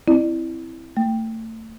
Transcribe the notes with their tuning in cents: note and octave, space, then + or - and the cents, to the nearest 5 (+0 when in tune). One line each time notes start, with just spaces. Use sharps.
C4 +0 E4 +0 D5 +30
A3 +30 G5 +0